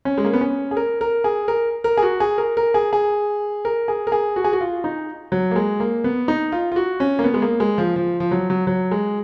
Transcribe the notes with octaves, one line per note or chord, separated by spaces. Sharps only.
C#4
G#3
A#3
B3
C#4
G#4
A#4
A#4
G#4
A#4
A#4
G#4
F#4
G#4
A#4
A#4
G#4
G#4
A#4
G#4
A#4
G#4
F#4
G#4
F#4
F4
D#4
F#3
A#3
G#3
A#3
B3
D#4
F4
F4
F#4
C#4
A#3
B3
G#3
A#3
G#3
F3
F3
F3
F#3
F#3
F#3
G#3